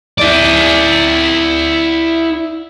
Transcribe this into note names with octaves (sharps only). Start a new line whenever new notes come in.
E4 D5